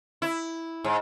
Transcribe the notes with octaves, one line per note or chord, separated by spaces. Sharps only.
E4
G#2